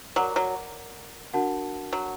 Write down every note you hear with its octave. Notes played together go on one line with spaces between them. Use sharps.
F#3 A#4 D5 F#5 A#5 D6
F#3
D4 F#4 A#4 F#5 A5
F#3